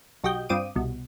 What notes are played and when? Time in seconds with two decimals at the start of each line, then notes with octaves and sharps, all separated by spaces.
0.24 B1 F#4 G4 D#5 G6
0.49 G2 C4 F4 D6 D#6 D#7
0.76 C2 B2